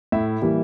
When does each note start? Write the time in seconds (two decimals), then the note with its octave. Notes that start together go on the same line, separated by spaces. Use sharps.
0.12 A2 E4 E5
0.42 E3 G3 A#3